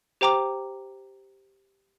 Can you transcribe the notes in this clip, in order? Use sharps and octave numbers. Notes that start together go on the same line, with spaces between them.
G4 C5 G5 A#5 D6